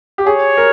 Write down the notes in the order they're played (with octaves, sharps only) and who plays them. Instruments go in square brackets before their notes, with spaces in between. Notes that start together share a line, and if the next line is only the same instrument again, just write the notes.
[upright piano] G4
[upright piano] G#4 [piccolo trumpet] C#5
[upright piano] A#4